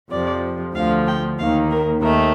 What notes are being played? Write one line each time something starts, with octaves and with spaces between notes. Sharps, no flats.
F2 C3 F3 D5
D2 D3 F3 F5
G5
D#2 D#3 A#3 F5
A#4
D#2 D#3 A3 A#4